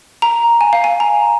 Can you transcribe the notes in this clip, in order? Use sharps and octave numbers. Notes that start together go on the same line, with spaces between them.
A#5
G#5
F5
G#5
A#5